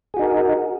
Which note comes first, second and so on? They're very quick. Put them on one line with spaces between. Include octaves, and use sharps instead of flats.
G#4 F#4 D#4 A#4